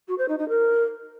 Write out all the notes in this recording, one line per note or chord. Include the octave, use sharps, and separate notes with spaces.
F#4
C5
D#4
D#4
A#4